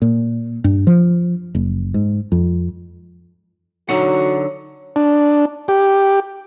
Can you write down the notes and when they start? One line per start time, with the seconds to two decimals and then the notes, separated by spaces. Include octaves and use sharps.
0.02 A#2
0.64 G2
0.87 F3
1.55 F#1
1.94 G#2
2.32 F2
3.89 D3 F#3 D#4 F#4 F#5
4.96 D4
5.68 G4